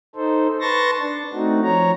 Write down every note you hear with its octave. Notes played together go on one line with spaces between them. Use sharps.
D#4 A4 C5
B4 A5 C6 C#6 A6 A#6
D4
A3 C4 D#4 F#4
F3 C#5 A#5